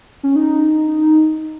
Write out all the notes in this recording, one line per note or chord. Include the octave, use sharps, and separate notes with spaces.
C#4
D#4